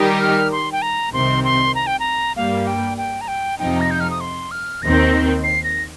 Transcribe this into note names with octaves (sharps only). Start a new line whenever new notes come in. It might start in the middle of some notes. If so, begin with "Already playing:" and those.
Already playing: D#3 G3 D#4 G4 A#4
F6
C6
G5
A#5
C2 C3 D#3 C4 C6
C6
A#5
G5
A#5
G2 G3 A#3 F5
G5
G5
A#5
G5
F2 C3 F3 D#4 G5
A#6
G6
F6
D#6
C6
F6
D#2 D#3 C4 A#6
C7
A#6